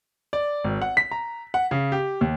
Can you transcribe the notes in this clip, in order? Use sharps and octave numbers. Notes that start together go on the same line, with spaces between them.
D5
G#1
F#5
B6
A#5
F#5
C#3
G4
D#2